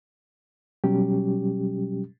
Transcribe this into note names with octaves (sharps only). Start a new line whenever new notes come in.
B2 F#3 G3 C#4 G4